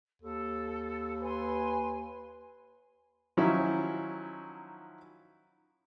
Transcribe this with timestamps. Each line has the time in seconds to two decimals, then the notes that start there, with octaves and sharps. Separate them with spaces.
0.22 D#2 A4
1.22 B4 G#5 C6
3.37 D#3 F3 F#3 C#4 D#4 E4